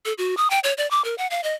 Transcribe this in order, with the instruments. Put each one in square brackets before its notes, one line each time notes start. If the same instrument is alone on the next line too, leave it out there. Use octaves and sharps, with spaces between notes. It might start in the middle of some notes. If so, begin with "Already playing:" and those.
[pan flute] A4
F#4
D#6
G5
C#5
D5
D6
A#4
F#5
F5
D#5